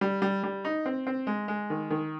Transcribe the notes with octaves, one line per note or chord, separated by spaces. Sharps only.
G3
G3
G3
D#4
C4
C4
G#3
G#3
D#3
D#3